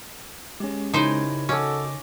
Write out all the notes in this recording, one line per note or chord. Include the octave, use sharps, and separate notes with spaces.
G#3 C#4 G4
C#3 D#4 E4 G4 A#4 C5 C#5 G#5
C#4 F#4 A4 D#5 D6